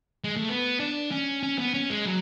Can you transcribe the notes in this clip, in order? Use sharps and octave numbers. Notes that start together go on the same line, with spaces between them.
G#3
A3
B3
D4
C#4
C#4
B3
C#4
G#3
F#3